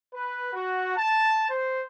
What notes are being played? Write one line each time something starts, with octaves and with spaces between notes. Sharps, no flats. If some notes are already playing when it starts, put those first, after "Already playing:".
B4
F#4
A5
C5